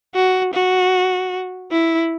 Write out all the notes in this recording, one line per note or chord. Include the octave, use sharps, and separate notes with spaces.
F#4
F#4
E4